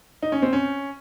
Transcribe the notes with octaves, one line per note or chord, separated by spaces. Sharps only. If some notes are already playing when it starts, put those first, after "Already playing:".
D#4
C#4
C4
C#4